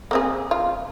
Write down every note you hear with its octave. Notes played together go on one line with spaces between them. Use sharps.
A#3 C4 G#4
F4